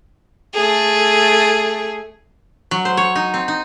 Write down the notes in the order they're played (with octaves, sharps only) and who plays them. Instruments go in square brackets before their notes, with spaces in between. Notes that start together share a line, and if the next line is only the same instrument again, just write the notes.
[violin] A3 G#4
[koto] F#3
C5
C#5
D#4
C4
D#4